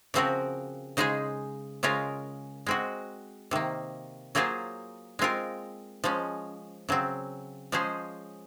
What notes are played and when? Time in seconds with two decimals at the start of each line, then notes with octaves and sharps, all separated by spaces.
0.14 C#3 F3 C4 F#4 A#4
0.97 C#3 G#3 D#4 G#4 C5
1.83 C#3 G#3 C#4 F4 A#4
2.66 G#3 C4 F#4
3.51 C3 D#3 A#3
4.35 F#3 A#3 F4 G#4 C5
5.19 G#3 C4 F4 A#4
6.04 F3 G#3 C#4
6.89 C#3 F#3 C4
7.72 F3 G#3 C#4 G#4 C5